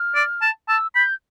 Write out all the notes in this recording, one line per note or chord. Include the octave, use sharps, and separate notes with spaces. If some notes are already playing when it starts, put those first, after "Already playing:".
Already playing: F6
D5
A5
A5 E6
B5 G6